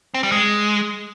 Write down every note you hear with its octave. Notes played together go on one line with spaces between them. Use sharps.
C4
G3
G#3